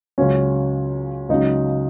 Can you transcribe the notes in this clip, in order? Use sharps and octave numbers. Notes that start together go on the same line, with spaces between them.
C#2 C#3 F#3 C#4
C#2 C#3 F#3 D#4